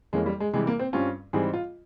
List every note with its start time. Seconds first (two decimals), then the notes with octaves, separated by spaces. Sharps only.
0.13 F2 E3 G#3 A#3 C#4
0.26 G3
0.40 G#3
0.53 C3 E3 G3 G#3
0.67 A#3
0.79 C4
0.93 G2 G3 C4 C#4 F4
1.33 G#2 E3 G3 C4 G#4
1.53 F4